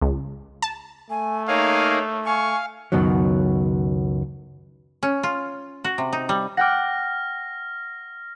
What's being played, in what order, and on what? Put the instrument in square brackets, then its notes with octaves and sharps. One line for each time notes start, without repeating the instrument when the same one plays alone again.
[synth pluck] C#2
A5
[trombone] A3 [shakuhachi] G#5
[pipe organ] A#3 D#4 G#4 [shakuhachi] C#5 [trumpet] F5
[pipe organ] F5 [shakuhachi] G#5 [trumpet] C#6
[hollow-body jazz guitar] C#2 F#2 B2 D#3 F#3
[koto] C#4
F4
F#4
C3
D#4
G3
[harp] F#5 G5 D6 [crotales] F6 A#6